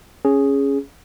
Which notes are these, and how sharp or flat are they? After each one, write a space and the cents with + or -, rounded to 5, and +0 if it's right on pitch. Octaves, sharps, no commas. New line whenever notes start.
C#4 +0 G#4 +0